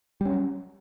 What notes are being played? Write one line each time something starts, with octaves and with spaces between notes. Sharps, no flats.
F#3 G3 C#4